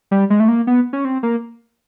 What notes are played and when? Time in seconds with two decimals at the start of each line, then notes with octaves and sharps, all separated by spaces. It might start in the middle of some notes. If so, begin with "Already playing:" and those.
0.11 G3
0.30 G#3
0.40 A3
0.48 A#3
0.67 B3
0.93 C#4
1.05 C4
1.23 A#3